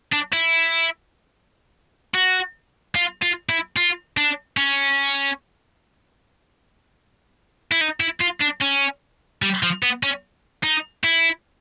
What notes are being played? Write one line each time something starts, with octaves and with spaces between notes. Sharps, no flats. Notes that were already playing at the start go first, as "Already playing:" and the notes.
D4
E4
F#4
F4
F4
E4
F4
D4
C#4
E4
D#4
E4
F4
D4
C#4
G3
F3
B3
C#4
D#4
E4